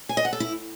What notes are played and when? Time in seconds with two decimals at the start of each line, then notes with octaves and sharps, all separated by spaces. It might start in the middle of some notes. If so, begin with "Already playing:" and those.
0.09 G#5
0.17 D#5
0.25 F#5
0.33 A4
0.40 E4